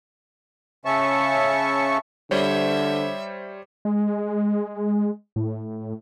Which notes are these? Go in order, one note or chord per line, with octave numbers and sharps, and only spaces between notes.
C#3 C#4 E5 A5 C#6
D3 G3 C5 C#5 E5
G#3
A2